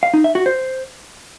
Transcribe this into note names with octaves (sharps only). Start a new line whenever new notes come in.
F5
D#4
E5
F#4
C5